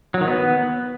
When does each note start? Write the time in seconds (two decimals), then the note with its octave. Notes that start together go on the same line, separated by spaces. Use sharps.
0.14 F#3
0.21 D#3
0.27 B3